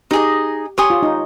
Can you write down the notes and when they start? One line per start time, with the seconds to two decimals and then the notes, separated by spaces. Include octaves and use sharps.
0.11 D#4 G4 G#4 D#5
0.78 G4 C#5 G#5 C6 D#6
0.90 F4
1.03 D#4